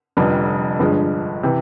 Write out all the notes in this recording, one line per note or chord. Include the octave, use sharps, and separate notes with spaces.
F1 F2 D3 G3
G1 G2 D3 F3 G#3
C3 E3